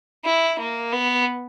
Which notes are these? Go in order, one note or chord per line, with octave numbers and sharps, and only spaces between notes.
E4
A#3
B3